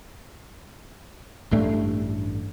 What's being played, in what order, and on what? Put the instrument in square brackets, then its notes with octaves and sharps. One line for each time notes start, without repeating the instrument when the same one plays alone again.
[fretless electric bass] A1 G2 A3 D4